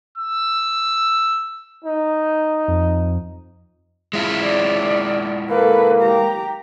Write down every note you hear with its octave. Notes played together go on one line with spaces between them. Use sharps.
E6
D#4
F2
G#3 E4 F4
D5
A#3 A4 B4
G4 A#5